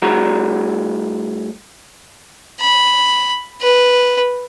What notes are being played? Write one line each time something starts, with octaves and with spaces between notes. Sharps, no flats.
A2 G3 F#4 G#4 F#5 A#5
B5
B4